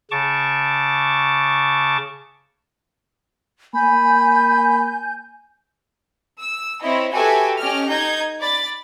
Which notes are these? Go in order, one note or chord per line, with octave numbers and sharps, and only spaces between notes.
C#3 A5 C#6 D6
A#3 G#5 B5 G6
E6
C4 E4 C#5 D#5
F#4 G4 A4 B4 E5 G#5
C#4 G4 D#5 F6
D#4 G6 G#6
D5 B5 A6